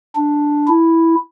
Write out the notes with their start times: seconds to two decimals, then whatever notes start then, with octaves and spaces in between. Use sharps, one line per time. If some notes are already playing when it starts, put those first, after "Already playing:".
0.16 D4
0.68 E4